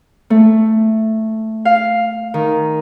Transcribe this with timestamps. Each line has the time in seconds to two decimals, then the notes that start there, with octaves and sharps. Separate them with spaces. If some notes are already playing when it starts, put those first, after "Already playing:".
0.30 A3
1.65 F5
2.34 D#3